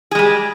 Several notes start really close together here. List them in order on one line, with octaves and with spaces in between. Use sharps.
G#4 G#3 G3